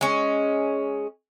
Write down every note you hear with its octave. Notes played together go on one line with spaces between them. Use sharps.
G#3 C#4